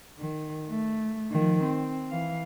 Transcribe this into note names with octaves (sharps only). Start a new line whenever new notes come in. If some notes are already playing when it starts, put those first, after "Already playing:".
D#3
A3
D#3 F3
C4
E3 F5